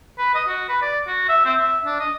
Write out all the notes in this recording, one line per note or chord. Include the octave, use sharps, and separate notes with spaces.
B4
D#5
F#4
B4
D5
F#4
E5
C4
E5
D4
D#5